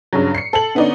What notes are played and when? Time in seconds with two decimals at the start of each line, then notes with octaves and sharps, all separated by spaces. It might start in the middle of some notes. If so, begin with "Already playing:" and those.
0.13 G2 C#3 F#3
0.35 C7 C#7
0.53 A4 F#7
0.75 D3 B3 C#4 D#4 D5